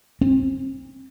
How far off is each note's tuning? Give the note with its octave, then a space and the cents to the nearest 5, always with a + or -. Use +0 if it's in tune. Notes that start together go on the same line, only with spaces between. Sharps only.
C4 +30